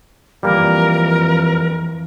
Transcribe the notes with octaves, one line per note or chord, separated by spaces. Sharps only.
F2 E3 F3 G3 A#3 A#4